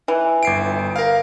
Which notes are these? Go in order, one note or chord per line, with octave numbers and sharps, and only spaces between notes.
E3
G1 C7 D7
A#4 F5